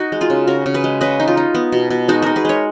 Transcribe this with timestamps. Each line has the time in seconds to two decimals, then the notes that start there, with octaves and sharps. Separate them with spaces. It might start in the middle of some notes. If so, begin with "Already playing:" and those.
Already playing: D#4 F#4
0.12 G#3
0.21 F4 G#4
0.30 C#3
0.47 C#3 F#4 A#4
0.66 C#3
0.74 G#4 B4
0.84 G#3
1.01 C#3 B4 D#5
1.20 D#4
1.28 F4
1.37 D#4
1.54 B3
1.72 B2
1.90 B2
2.08 G#3 D#4 F#4
2.22 D#4 F#4 A#4
2.36 G#4 B4
2.45 G#3 A#4 C#5